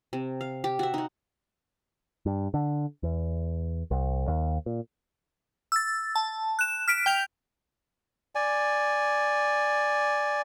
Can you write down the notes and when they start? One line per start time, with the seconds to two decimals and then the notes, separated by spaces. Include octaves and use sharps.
0.13 C3
0.41 F5
0.64 G4
0.79 F#4 E5
0.94 D#4 F#4
2.26 G2
2.54 D3
3.03 E2
3.91 C2
4.28 D#2
4.66 A#2
5.72 E6 A6
6.16 A5
6.59 F#6 E7
6.88 F6 B6 D7
7.06 G5 G6 F7
8.35 D5 G#5